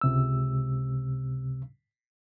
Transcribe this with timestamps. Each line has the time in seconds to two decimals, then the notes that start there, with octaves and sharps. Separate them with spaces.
0.01 C#2 C3 E6